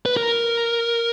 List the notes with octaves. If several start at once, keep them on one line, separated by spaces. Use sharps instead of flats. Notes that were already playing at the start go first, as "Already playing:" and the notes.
B4
A#4